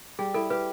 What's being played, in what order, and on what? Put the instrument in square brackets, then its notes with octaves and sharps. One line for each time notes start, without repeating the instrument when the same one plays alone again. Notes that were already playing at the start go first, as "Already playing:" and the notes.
[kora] G3 [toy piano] G#4
[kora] E4 [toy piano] A4
[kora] G4 [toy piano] B4